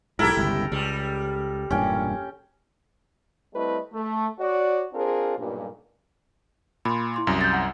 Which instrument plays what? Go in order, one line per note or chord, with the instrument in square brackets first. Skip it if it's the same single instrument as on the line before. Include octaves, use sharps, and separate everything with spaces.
[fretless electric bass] B1 G#2 [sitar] E4 G4 [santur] A4 A#4
[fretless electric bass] G1 C#2
[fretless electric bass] C#2 [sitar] G3
[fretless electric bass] E1 G2 A#2 [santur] C#4 G5
[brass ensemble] G3 A3 C4 E4 B4 D#5
A3
F#4 C#5 D5
C4 D4 F4 G#4 A#4 C5
B1 G2 A#2
[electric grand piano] A#2 [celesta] B5 C6
[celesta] E4 C6 D6
[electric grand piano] C2 F#2
[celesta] G6 A6
F#5